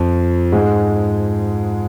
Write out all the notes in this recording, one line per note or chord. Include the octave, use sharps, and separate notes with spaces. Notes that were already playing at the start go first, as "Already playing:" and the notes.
Already playing: F2 F3
G#2 G#3